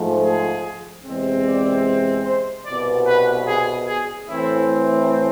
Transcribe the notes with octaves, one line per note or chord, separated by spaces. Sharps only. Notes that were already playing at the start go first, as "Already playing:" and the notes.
Already playing: G#2 F3 A3
G#4
E2 C3 G#3 C4
D5
C5
C2 B2 B3 D5
B4
G#4
G#4
A2 E3 A3 C4 E4